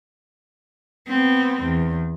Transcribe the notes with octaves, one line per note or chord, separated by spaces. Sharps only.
B3 C4
E2